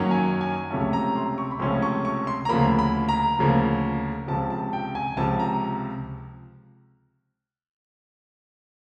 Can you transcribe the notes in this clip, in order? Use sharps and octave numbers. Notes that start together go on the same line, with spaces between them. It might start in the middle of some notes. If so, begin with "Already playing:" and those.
Already playing: F#2 D#3 F#3 A#3 C#4
G#5
G#5
C#2 C3 F3 A3 C#4 A5
A#5
C6
C#6
B5
C#2 C3 F3 A3 C#4 C6
C#6
C#6
C6
A#5
D2 C#3 F3 A#3 B5
B5
A#5
D2 C#3 F3 A#3
C#2 C3 F3 A5
A5
G5
G#5
C#2 C3 F3 A5
A#5